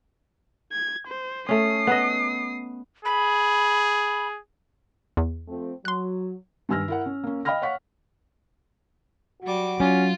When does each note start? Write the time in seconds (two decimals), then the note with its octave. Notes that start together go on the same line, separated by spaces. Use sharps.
0.72 G#6
1.07 C5
1.49 A3 C#4 D#6 C7
1.87 B3 B4 D#5
3.05 G#4 B5
5.17 E2
5.48 F3 A3 C4
5.85 F#3 C6 F#6
6.69 G2 D#3 G#5 E6 F6 A#6
6.88 E4 A#4 F#5
7.06 C#4
7.23 A#3 C#4
7.45 D#5 F5 G5 B5 F6 A#6
7.62 C#5 F5 F#5 C#6 B6
9.42 F#3 G3 F#4 D6
9.80 F#3 C#4 F4